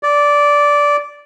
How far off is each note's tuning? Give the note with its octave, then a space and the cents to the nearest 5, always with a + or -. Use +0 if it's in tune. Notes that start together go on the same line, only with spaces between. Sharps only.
D5 -10